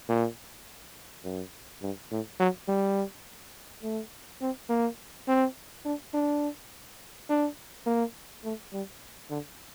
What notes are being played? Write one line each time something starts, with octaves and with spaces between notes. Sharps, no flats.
A#2
F#2
G2
A2
F#3
G3
A3
C4
A#3
C4
D4
D4
D4
A#3
A3
G3
D3